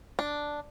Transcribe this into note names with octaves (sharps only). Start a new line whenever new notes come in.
D4